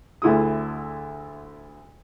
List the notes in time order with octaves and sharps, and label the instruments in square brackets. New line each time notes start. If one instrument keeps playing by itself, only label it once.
[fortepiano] D2 D3 E4 G#4 D#6